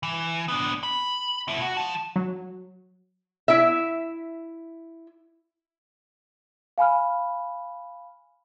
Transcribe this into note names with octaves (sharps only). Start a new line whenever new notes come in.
E3
B3 D4
B5
B2 E4
F#4
F3 A5
F#3
E4 E5
F5 G#5 B5 F6